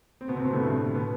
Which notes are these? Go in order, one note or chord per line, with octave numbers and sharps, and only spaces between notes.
C4
B2 B3
C3 C4
B2 B3
A2 A3
G2 G3
B2 B3